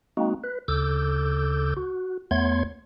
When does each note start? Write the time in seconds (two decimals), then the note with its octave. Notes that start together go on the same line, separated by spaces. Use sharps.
0.17 G#3 A#3 C4 D#4 F#4
0.44 B4
0.68 D2 C#3 A4 D6 E6 G6
1.77 F#4
2.31 E2 A3 B3 C#5 C6 G#6